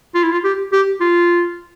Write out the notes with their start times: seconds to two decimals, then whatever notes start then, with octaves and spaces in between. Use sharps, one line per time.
0.15 F4
0.24 E4
0.32 F4
0.44 G4
0.73 G4
1.01 F4